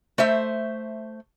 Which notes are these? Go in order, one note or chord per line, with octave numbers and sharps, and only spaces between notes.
A3 C5 E5